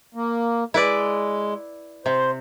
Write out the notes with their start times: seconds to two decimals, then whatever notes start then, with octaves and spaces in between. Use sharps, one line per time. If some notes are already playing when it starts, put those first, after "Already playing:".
0.15 A#3
0.74 G#3 E4 B4 D5
2.06 C3 C5